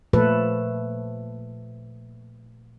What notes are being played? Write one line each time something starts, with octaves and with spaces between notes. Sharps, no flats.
A#2 F3 A3 A4 B4